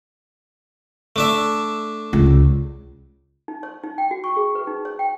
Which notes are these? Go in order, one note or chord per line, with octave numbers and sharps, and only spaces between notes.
A3 D4 E5
C#2
D#4
C#5
D#4
G5
F#4
C#6
G#4
B4
D#4
C#5
G5